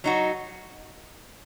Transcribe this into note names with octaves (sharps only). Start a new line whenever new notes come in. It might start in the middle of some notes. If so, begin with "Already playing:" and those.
F#3 D#4 F#4